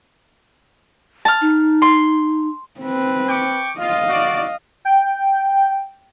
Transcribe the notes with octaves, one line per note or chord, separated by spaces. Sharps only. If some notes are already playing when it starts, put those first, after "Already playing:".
A5 F6
D#4
C6
C4 B4
G5 C#6 D6
F4 D#5 F5
F#4 D5
G5